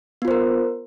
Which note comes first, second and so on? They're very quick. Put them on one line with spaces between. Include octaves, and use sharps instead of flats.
B3 F4 C5 A#4